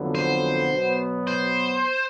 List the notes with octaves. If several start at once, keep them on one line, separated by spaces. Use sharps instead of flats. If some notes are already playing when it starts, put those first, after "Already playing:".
Already playing: F2 D3 F#3 B3
C5
B2 F#3 B3
C5